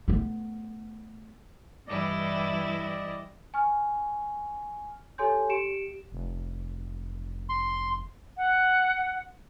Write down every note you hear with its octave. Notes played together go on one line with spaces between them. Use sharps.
A3 B3
G2 E3 G3 E4 D5 D#5
G#5 C#6 F6
G4 A4 C#5 G#5 C6 G6
G4 C#7 D7 E7
F1
C6
F#5